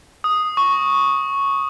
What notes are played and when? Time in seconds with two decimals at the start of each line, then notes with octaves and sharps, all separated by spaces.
0.24 D#6
0.57 C#6